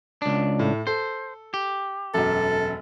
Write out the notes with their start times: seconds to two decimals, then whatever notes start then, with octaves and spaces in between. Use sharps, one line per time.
0.22 C#2 D4
0.59 A2
0.87 A4 C5
1.54 G4
2.14 E1 F#2 A4